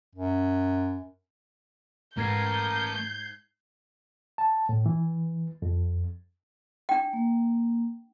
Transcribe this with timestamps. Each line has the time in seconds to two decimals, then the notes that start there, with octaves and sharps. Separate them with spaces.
0.15 F#2
2.18 G#2 A3 A#4 B4 G6 G#6 C7
4.38 A5
4.69 A2
4.86 E3
5.62 F2
6.89 D4 G5
7.13 A#3